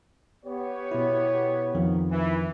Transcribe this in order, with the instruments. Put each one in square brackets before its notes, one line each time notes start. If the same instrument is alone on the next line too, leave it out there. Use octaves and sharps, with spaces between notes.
[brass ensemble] B3 G4 C#5
[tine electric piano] B2 E4
F2 D#3 F3
[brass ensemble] E3